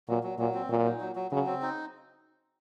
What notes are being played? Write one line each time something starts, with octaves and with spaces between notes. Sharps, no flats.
A#2 F#3
F#3
A#2 F#3
C4
A#2 F#3
D#4
F#3
F#3
C#3 F#3
C4
D#4